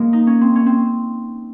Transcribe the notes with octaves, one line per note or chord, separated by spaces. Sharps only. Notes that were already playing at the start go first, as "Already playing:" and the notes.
Already playing: G#3 A#3
D#4
C#4
C4
C#4
C4